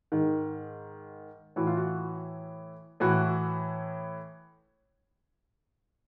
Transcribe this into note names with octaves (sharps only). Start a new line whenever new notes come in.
G#2 D#3
A2 E3 F#4
F4
F#4
A2 E3 F#4